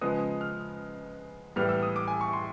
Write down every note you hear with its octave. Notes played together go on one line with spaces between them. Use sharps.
C#3 F3 G#3 B3 D#6
F6
A2 E3 G3 B3 F6
E6
D#6
D6
G#5
C#6
C6